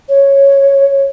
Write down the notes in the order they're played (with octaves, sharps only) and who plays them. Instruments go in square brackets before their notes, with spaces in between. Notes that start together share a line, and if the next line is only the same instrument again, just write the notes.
[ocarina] C#5